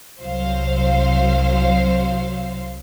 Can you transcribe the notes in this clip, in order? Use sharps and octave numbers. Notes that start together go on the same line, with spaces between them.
C2 F#3 C5 F5